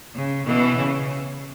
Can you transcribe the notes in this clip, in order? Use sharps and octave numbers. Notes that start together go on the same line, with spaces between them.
C#3
B2 E3
C#3